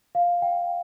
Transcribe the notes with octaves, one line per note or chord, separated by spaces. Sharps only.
F5
G5